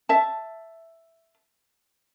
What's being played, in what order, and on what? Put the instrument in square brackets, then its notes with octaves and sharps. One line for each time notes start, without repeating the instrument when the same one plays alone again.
[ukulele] E5 A5